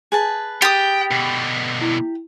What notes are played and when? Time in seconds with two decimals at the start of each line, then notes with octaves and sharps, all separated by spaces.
0.12 G#4 B4 A5
0.62 G4 G5 D#6 A6
1.11 B2 D3
1.81 E4